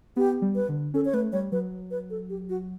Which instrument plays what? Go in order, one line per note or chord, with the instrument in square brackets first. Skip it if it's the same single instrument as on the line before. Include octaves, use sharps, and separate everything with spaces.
[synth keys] B3 [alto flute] G4
[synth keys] G3
[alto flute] B4
[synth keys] D3
[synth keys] C#4 [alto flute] A4
[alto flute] C#5
[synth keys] A3 [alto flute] B4
[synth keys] G3 [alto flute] C#5
[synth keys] F#3 [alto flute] B4
[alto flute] B4
A4
G4
F#4